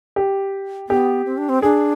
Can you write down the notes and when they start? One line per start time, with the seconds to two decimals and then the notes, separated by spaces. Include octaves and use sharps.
0.16 G4
0.89 B3 G4
1.26 C4
1.38 D4
1.49 C4
1.62 D4 G#4